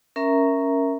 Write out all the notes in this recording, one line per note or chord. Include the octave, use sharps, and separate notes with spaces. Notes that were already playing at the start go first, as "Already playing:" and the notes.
C#4 A#4 E5 A#5